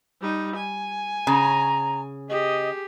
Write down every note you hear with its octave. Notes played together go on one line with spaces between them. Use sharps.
G3 D#4
G#5
C#3 A#5
G4 G#4 D#5